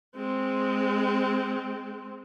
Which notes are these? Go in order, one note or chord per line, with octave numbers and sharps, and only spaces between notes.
G#3 C4